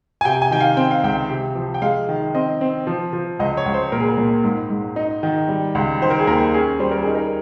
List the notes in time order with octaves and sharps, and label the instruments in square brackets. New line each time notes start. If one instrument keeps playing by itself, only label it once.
[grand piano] G#5
C3 G5
G#5
D#3 G5
F5
C4 G5
F5
C#2 G5
C3
F3
G5
G#3 F5
D#3
C4 D#5
C4
F3
F3
C#2 D#5
C#5
C#2
C5
A#2 A#4
G#4
A#4
A#2
G#2
G#2
D#4
D#3
G3
C#2
D#3 C5
A#4
G#4
D#2 A#4
C#4 G#4
G3 C5
A#4
D#4 G#4
A#4